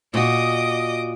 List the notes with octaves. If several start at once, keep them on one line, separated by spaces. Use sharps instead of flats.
A#2 F#4 D#5 D6 D#6